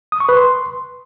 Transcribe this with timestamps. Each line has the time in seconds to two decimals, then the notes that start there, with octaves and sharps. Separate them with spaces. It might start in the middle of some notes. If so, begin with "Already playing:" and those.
0.12 D#6
0.20 C#6
0.29 B4
0.37 C6